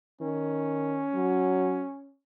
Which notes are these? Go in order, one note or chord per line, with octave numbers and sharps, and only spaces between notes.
D#3 C#4
F#3